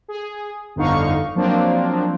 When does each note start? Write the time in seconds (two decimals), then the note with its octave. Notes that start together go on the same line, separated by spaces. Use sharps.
0.08 G#4
0.76 G1 F2 D3 D#4 F5 C#6
1.35 F3 F#3 A#3 C4 D4 F4